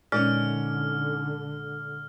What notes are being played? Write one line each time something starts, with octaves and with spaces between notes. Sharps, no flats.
A#2 D3 G#3 C#4 D#4 D5 F6